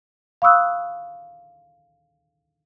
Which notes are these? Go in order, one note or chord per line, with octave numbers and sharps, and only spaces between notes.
F5 B5 C#6 D#6 E6 F#6